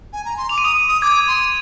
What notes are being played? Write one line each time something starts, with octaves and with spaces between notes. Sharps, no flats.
G#5
A#5
C6
D6 F7
D#7
D#6 F7
D#6
D6 G#6
C6